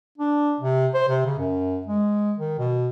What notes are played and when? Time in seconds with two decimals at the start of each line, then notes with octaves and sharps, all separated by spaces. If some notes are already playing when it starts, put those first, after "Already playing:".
0.18 D4
0.61 C3
0.94 C5
1.09 C3
1.26 C#3
1.39 F#2
1.87 G#3
2.38 D#3
2.59 B2